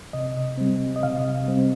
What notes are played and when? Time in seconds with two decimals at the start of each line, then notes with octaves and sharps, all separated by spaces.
0.13 C3 D#5
0.57 G3 C4
0.96 D#5
1.03 C3 F5
1.48 G3 C4